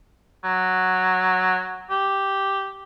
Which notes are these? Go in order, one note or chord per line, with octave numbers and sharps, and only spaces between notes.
F#3
G4